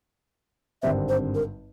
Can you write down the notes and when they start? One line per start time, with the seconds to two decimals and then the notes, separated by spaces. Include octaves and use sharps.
0.83 G#1 G2 D3 G3 C4 E5
1.09 C5
1.35 A#4